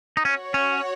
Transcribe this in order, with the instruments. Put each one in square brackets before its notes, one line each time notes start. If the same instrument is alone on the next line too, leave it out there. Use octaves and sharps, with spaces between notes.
[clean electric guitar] D#4
[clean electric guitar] C#4 [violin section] F#4 C#5 F#5
[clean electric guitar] C#4